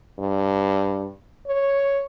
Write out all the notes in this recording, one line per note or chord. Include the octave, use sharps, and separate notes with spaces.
G2
C#5